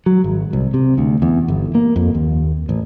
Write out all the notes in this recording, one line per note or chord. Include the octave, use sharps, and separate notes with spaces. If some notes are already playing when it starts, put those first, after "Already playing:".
F#3
G#1
C2
C3
D2
E2
G1
A#3
F2
D#2
A1